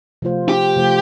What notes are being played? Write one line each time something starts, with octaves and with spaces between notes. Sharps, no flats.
C3 F3 A3 F4 C5
G4
C3 F3 A3 F4 C5